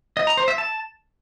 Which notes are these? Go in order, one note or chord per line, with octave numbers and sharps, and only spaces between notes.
D#5
A#5
C5
E5
A5